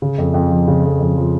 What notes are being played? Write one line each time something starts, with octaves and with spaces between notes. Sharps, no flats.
C#3
F2
F2
F3
C#3
F2
F2
F3